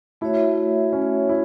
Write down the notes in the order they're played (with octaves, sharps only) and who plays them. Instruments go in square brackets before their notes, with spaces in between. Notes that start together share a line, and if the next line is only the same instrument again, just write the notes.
[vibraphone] A3 F#4 C#5 E5 [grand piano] E4
[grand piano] C#4
E4